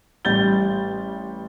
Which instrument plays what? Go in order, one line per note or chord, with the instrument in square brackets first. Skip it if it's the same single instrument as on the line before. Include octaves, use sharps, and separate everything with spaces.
[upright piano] A1 G3 G6 A6 G7